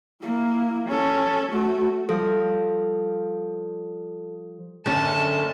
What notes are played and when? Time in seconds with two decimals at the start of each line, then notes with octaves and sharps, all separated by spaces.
0.22 A#3 E4
0.87 C#4 A4
1.52 A3 F#4
2.09 F3 G3 A4
4.86 F#1 D3 A3 C#4 A5